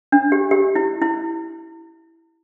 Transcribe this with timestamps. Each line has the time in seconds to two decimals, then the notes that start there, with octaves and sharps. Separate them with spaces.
0.12 D4
0.32 G4
0.51 G4
0.75 E4
1.02 E4